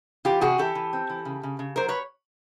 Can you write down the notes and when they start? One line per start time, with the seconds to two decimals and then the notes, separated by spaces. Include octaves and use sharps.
0.25 E3 F4 G4
0.41 C3 F#4 G#4
0.58 E3 G4 A4
0.75 E3
0.93 C4
1.10 E3
1.25 C#3
1.43 C#3
1.59 C#3
1.76 F#3 A#4 C5
1.88 B4 C#5